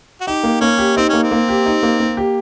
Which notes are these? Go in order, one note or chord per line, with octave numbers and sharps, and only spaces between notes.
F#4
D#4 G4
A#3
A#3 C#4
G4
C4 D#4
A#3 C#4
C4
A#3
G4
D#4
A#3
A#3
G4